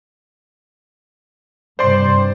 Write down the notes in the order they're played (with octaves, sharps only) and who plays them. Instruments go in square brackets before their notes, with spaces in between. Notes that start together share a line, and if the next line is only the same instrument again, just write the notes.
[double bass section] G2 C3 G3 [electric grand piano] C5 D5 C6